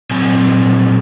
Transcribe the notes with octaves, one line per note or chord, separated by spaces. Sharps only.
A#2 F#3 C4 G#5